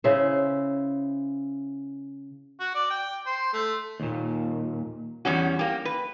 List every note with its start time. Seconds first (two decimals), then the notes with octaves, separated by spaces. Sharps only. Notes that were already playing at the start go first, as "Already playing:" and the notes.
0.04 C#3 E4 C5
2.60 F#4
2.75 D5
2.90 G5
3.26 C5
3.53 A3
4.00 D#2 A#2
5.25 E2 G3 C#4 F#4
5.59 A#3 G4
5.85 B4